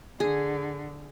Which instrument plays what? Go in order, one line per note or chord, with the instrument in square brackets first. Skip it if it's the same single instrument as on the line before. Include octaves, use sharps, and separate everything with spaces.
[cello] D3 [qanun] G#4